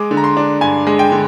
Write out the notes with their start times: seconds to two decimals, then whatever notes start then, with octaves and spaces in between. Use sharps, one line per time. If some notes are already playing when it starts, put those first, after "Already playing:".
Already playing: G#3 D6
0.11 D3
0.17 A#5
0.24 C6
0.37 D4
0.61 G2 G#5
0.87 G#3
0.99 G5
1.12 D3